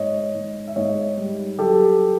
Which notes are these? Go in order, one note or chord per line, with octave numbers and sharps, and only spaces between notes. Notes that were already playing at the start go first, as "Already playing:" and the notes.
Already playing: G#2 C#5 D#5
G#2
E5
G#2 C#5 D#5
G3
F#3 G4 A4